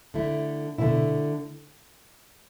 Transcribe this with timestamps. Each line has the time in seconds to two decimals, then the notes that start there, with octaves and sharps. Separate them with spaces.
0.14 D3 A3 E4
0.78 B2 D3 A3 E4